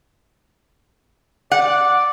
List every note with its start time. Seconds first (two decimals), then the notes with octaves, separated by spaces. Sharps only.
1.51 D5 F#5